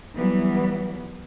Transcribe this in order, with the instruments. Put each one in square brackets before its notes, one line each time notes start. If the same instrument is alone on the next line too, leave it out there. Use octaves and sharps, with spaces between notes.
[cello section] E3 F#3 G3 B3